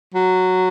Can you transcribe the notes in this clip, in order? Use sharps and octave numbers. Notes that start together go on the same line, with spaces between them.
F#3